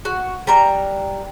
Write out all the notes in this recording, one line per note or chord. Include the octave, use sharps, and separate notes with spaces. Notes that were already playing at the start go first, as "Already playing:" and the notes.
F#4
G3 D4 A#5